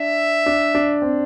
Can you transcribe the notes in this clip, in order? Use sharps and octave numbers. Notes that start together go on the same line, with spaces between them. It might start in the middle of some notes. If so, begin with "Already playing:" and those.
Already playing: D4 E5
D4
D4
C4